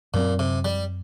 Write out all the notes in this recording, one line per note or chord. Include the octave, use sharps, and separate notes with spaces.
F#2 A#2 F#3 C4
C3
G3